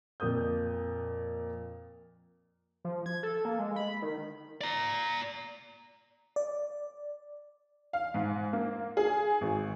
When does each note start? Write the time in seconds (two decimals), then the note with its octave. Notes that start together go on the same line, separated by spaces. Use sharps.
0.20 F2 A#2 A#3 D#6 G6
2.85 F3
3.06 G#6
3.23 A4
3.45 A#3
3.59 G#3
3.76 B5
4.02 D#3
4.61 D5 A#5
6.36 D5
7.93 F5
8.14 G#2
8.53 A#3
8.97 G#4
9.41 G#1